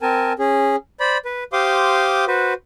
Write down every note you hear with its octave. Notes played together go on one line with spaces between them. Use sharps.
C4 A#4 G#5 A5
C#4 G#4
C5 D5 B5
B4
G4 C5 F5 C6 D6 D#6
F#4 B4 C5